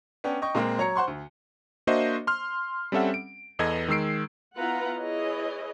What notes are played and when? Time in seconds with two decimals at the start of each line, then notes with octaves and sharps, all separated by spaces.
0.24 B3 C#4 D4 G5
0.42 D#5 G5 C#6
0.55 A#2 G#3 A#3 C4
0.78 F#3 C#5 A#5 C#7
0.96 C5 F#5 C6 C#6
1.07 D2
1.87 A#3 D4 F#4 C5 D#5 E5
2.27 C6 F6
2.92 G3 C4 C#4 A4 E5 F#5
3.14 D7
3.59 E2 B3 A4 D#5 G#6
3.88 D#3 G#3 E6 C7 D7
4.57 B3 E4 F4 B4 F#5 A#5
4.99 E4 G#4 B4 C#5 D#5